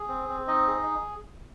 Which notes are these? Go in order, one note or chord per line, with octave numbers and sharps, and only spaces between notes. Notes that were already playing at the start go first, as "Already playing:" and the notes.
Already playing: G#4
C4
C4
D#4 D#5
G#4